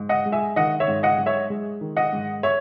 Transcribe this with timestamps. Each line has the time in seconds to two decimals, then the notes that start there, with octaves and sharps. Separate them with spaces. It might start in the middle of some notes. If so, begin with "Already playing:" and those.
Already playing: G#2
0.09 D#5 F#5
0.26 G#3
0.32 E5 G#5
0.56 D#3 D#5 F#5
0.80 C#5 E5
0.88 G#2
1.03 D#5 F#5
1.18 G#2
1.26 C#5 E5
1.50 G#3
1.81 D#3
1.96 D#5 F#5
2.13 G#2
2.43 C#5 E5